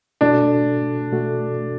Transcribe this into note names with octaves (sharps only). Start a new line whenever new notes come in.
B2 A3 D4 F#4 A4
B2 A3 F#4 A4